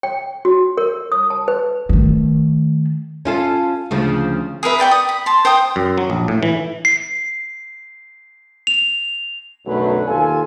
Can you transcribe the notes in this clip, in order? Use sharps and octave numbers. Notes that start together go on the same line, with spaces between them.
G5
F#4
A#4
D#6
A5
B4
D#3 A3
C#4 F4 A4
D2 C#3 F3
G#4 A#4 B4 E5
B4 D5 G5 C#6
D#6
B5
A5 C6
C5 G5 D#6
F#2
F#3
A#1
A2
E3
C7
F7
B1 F#2 D3 F#3 A3 B4
D#2 F4 A4 G#5